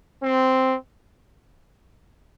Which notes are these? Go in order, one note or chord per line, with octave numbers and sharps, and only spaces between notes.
C4